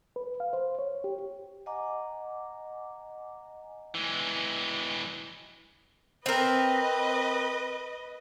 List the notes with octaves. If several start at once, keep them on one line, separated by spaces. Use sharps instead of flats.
B4
F5
C5
C#5
G4
D#5 F#5 G#5 A#5 D6
E3 G#3
C4 A#4 B4 D#5